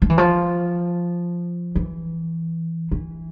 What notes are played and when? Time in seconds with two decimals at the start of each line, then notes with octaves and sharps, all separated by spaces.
0.02 F3
0.10 E3
0.18 F3
1.75 E3
2.92 E3